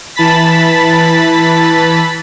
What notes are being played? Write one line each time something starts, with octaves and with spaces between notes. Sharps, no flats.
E3 A5 B5 A6 B6